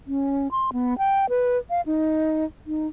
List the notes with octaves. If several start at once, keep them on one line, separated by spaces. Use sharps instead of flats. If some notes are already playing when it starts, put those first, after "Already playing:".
C#4
C6
B3
G5
B4
F5
D#4
D#4